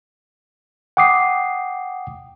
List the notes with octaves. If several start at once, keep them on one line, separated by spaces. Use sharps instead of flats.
F#5 G5 D6 D#6 C7